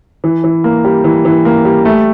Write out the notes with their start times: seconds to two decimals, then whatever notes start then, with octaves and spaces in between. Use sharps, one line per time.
0.24 E3
0.44 E3
0.64 A#3
0.84 G3
1.04 E3
1.25 E3
1.45 A#3
1.65 G3
1.85 A3